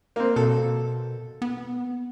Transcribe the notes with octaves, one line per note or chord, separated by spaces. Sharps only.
A#3 C4
B2 A4
B3